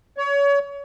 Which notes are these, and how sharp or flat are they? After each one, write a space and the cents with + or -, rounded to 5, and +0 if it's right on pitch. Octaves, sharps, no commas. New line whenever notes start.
C#5 +30